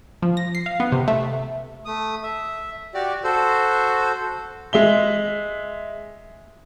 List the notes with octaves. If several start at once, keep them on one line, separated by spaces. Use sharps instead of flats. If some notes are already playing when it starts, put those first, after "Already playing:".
F3
A#6
C7
F5
B3
C3
A3
A3 D#6
E5
F#4 G4 D5
F#4 A4 C5
G#3 E5 G7